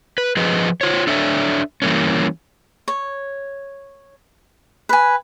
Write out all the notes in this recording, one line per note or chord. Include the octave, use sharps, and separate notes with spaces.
B4
F3 G#4 B4 D#5
F4 C5 C#5
D4 A4 C#5 D5 E5
E3 G3 A#3 C#4
C#5
B4 G#5